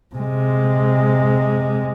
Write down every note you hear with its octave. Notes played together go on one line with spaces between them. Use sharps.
C3 G#3